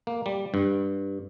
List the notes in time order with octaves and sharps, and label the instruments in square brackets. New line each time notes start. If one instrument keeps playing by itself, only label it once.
[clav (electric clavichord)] A#3
G3
G2